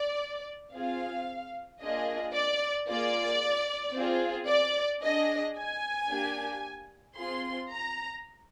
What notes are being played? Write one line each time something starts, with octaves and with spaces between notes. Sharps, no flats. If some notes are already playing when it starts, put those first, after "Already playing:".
Already playing: D5
C4 F4 G#4 F5
A#3 D4 F4 G#4 D#5
D5
A#3 F4 G#4 D5
C4 F4 G#4
D5
D4 G#4 D#5
G#5
A#3 D4 G4
C4 F4 G#4 C6
A#5